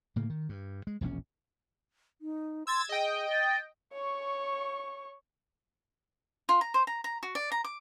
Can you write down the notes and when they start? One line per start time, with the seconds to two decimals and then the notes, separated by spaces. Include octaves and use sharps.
0.16 A2 C#3 A#3
0.30 D#3
0.49 G2
0.87 G#3
1.01 E1 A#1 C4 C#4
2.21 D#4
2.67 C6 E6 G#6 A6
2.89 G#4 D#5 G5
3.31 A6
3.93 C#5 C#6
6.49 F4
6.61 A#5
6.74 C5
6.87 A#5
7.04 A#5
7.23 F#4
7.35 D5
7.52 A#5
7.64 D6